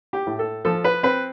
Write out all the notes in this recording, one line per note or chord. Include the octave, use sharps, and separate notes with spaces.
G4
A2
A4
F3 A4
B4
C4 B4